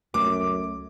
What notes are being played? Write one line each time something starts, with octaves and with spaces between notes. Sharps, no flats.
C#2 F#2 A3 D6